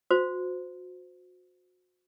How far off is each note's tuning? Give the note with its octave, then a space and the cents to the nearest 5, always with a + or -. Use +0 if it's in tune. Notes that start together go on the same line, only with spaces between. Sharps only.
F#4 -30 C5 -25